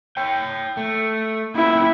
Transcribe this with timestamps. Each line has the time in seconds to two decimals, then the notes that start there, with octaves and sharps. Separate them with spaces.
0.17 C#5 G5
0.77 A3
1.55 A#3 B3 C#4 E4